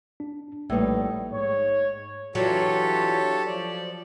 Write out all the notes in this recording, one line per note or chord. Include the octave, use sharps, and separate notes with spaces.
D4
A#1 A2 G3 A#3 D#4 B4
G#2 C#5
E3 F#3 D4 F4 G4 A4 C#5
F3 D5